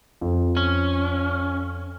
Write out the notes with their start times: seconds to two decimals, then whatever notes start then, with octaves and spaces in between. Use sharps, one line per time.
0.21 F2
0.57 C#4